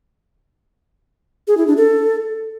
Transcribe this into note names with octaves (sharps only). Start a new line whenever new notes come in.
G#4
E4
D4
A4